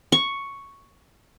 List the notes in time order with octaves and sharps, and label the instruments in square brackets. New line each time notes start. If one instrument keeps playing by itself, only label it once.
[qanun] C#6